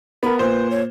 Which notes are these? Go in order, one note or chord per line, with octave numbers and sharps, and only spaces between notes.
B3 A#4 B5
A#2 B4 C5
C#5